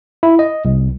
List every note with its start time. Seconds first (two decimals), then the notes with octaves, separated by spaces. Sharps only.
0.23 E4
0.39 D#5
0.65 C2